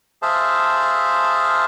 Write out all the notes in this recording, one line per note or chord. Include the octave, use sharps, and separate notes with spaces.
G#4 C5 E5 F5 A5